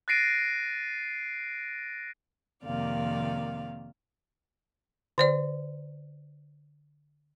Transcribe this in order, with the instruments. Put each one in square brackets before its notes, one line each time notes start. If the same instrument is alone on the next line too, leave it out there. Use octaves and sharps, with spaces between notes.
[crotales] F#6 A6 A#6 C7 D7 D#7
[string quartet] F2 C3 D#3 A#3 D5 F5
[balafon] D3 C5 D5